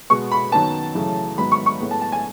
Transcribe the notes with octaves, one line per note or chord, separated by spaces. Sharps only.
B2 G#3 B3 C#6
B5
F#2 D#3 F#3 B3 A5
F#2 C#3 E3 A3
G#2 D#3 F#3 B3 B5
C#6
C#6
A2 G#3 B3
A5
A5
G#5